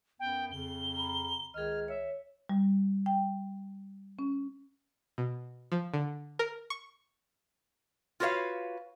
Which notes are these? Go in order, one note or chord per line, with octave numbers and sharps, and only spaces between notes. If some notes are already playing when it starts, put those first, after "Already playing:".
F#2 B3 G5
F2 C#3 G7
A#5 B5
C#2 D#3 G#4 D#5 F6
C#5 E5
G3
G5
C#4
B2
F3
D3
A#4
C#6
F4 F#4 B4 C#5 F5